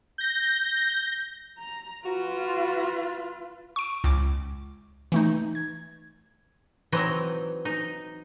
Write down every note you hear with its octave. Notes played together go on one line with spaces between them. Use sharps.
G6 A#6
A#5
F4 F#4 B4
C#6 D7
C#2 D6
E3 A3 D#4
G#6
E3 F#3 C4 D#4 D#5
D#4